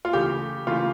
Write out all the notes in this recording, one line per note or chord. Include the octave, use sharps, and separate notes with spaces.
F4
C#3 E3 A3 G4
C#3 E3 A3 F4